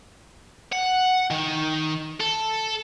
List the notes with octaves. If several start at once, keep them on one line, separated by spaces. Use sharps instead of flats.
F#5
D#3
A4